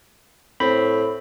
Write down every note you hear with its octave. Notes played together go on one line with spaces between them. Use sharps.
A2 C4 B5